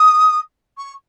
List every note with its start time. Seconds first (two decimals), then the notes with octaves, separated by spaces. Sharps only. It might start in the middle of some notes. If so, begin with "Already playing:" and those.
Already playing: D#6
0.77 C#6